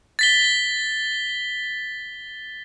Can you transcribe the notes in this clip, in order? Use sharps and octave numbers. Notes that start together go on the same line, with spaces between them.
A6 B6 G7